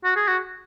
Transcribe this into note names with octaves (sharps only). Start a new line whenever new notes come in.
F#4
G#4
F#4